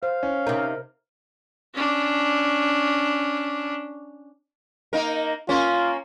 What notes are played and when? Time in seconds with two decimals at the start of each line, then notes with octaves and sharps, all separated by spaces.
0.03 C5 F5
0.23 C#4
0.47 C3 D#4 A#4
1.74 C#4 D4
4.93 A#3 D#4 A#4
5.49 A#3 C#4 F4